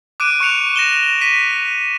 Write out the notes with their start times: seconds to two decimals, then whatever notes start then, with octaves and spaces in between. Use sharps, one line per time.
0.20 D6 F#6 D7 D#7
0.40 C#6 F#6 C#7 F7
0.76 A#6 E7 G7
1.21 B6 D#7